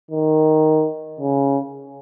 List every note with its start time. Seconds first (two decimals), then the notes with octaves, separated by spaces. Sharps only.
0.11 D#3
1.20 C#3